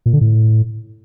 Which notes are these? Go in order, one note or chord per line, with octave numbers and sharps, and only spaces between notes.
A#2
D3
A2